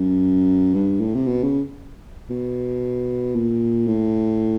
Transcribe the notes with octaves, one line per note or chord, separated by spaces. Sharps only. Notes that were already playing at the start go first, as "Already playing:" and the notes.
Already playing: F#2
G2
A2
C3
B2
C#3
B2
A#2
A2